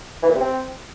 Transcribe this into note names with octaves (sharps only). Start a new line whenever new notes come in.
E3
A#2
C3
C4